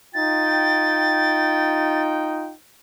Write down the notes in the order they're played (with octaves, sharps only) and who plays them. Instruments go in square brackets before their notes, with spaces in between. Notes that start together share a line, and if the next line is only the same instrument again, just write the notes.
[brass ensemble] D#4 F4 G5 [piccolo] A6